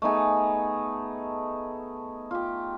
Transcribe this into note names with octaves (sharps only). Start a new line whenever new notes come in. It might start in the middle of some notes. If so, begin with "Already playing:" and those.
A3 B3 D#4 G#4
F4 G4